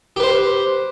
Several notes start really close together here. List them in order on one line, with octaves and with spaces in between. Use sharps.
G4 B4 C5